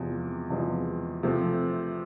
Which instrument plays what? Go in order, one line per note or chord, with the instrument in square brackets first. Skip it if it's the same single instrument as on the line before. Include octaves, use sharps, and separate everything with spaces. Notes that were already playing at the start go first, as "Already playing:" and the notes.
Already playing: [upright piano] E2 C3 F3 G#3
E2 C3 F3 G#3
C3 F3 A3 C4